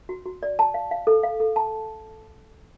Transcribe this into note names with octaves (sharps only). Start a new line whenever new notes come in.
F#4
F#4
D5
A5
F5
F5
A4
F5
A4
A5